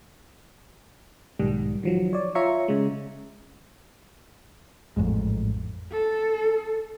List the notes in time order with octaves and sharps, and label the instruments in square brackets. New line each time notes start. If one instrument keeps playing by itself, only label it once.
[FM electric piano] B1 G#2 D#3 G3
D#3 F3 F#3
C#5 D5
F4 C#5 E5 A#5 C#6
C#3 G#3
[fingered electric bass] A1 F2 G#2
[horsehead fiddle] A4